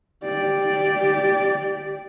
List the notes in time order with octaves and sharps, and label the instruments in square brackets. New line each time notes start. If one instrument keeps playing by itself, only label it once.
[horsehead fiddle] G4 D5